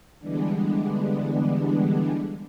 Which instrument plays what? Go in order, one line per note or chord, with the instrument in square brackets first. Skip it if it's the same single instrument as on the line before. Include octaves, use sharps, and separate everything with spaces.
[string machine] D3 E3 G3 G#3 B3 D4